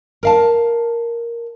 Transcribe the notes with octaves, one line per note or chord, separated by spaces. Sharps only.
A#4 F5 A5